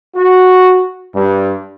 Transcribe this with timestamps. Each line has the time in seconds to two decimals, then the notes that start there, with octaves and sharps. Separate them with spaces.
0.15 F#4
1.15 G2